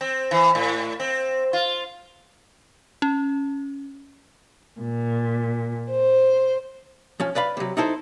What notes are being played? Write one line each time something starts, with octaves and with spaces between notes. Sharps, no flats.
C4
E3
A2
C4
F4
C#4
A#2
C5
F3 C#4
B4 D5 F5 B5
C3 F#3
D#4 E4 A4 C5